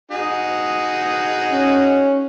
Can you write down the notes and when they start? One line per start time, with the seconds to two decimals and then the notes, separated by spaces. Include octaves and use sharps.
0.11 D#4 F#4 G#4
1.52 C#4